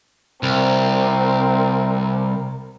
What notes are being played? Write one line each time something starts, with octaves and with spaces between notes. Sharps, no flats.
C2 C4 A#4